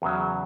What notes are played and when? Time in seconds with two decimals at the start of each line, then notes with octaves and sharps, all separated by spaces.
0.02 E2 C#3 F#3